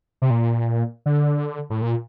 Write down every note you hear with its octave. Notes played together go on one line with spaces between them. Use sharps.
C3
A#2
D3
A2
A#2